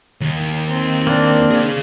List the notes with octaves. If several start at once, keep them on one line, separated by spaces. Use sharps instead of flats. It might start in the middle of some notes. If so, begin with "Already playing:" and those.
D#2
C4
A#3 D4
G#4 F5